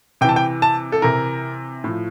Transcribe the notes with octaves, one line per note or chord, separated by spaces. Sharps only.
C3 E3 G5 A5
G5
A5
A4
C3 E3 A#4
A2 F3